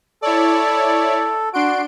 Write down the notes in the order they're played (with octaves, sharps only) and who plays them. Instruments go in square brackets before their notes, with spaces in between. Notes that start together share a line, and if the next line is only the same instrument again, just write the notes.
[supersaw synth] E4 C#5 D5 [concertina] A4
[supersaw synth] D4 C6 D7 [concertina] F#4